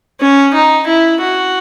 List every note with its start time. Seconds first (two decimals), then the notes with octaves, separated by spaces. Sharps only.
0.21 C#4
0.54 D#4
0.87 E4
1.21 F#4